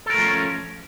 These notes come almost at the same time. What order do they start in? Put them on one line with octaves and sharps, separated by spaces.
A4 A#4 A3 F3 C#4